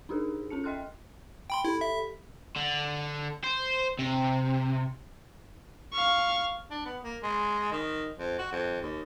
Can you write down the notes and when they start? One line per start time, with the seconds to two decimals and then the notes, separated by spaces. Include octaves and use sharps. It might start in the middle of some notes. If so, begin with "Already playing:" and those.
0.09 D4 D#4 G4 G#4 A#4
0.50 C#4 A4 A5 C#7
0.64 D#5 E5 G5 C6 F6 F#6
1.50 G5 B5 C6
1.65 E4 G4 A4 B5
1.81 E5
2.56 D3
3.44 C5
3.99 C3
5.94 F5 C#6
6.71 D4
6.85 B3
7.04 A#3
7.23 G#3
7.72 D#3
8.18 F2
8.38 F#4
8.52 F2
8.81 D#2